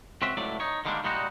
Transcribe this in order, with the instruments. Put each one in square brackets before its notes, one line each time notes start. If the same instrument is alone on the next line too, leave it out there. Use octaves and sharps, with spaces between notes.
[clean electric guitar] C#2 C4 C#4 F#4 E5
C#2 A2 F#3 A3 D5
D#4 C#5
D3 D#3 G3 G#3 A#3 D4
A#2 G3 G#3 D#4 F#4